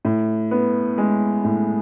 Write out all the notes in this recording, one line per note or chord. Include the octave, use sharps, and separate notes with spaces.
A2
B3
G#3
A2